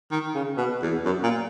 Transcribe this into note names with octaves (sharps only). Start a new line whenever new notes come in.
D#3
C#3
B2
E2
F#2
A#2